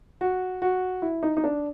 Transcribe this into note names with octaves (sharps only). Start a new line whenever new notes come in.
F#4
F#4
E4
D#4
D#4
D4